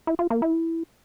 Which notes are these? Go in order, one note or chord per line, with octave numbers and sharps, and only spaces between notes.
E4
F4
A#3
E4